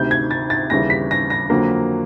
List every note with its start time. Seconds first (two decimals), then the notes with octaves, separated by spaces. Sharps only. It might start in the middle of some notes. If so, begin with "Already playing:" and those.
Already playing: D2 C3 D#3 G6
0.11 G#6
0.31 A6
0.50 A6
0.70 D#2 C#3 E3 G3 A#6
0.90 B6
1.11 A#6
1.30 A#6
1.50 F2 D3 F#3 A#3